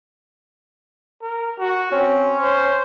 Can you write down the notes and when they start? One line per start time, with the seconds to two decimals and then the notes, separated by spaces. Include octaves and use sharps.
1.22 A#4
1.59 F#4
1.92 C4 C#4
2.41 C5